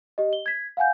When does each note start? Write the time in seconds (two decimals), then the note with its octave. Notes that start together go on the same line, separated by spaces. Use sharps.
0.18 G4 D#5
0.33 G7
0.46 G#6 B6
0.77 F5 F#5 G#5 G6